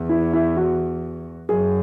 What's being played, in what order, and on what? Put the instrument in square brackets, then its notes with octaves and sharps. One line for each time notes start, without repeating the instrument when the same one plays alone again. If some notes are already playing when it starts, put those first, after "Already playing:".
Already playing: [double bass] E2
[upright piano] E4
E4
F#4
[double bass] F#2 [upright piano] G#4